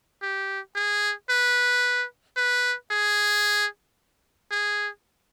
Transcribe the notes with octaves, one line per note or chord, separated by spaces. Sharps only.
G4
G#4
B4
B4
G#4
G#4